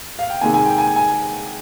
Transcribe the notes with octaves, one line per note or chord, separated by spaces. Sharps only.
F5
G5
C3 D#3 G#3 G#5
G#5
G5
G#5
G#5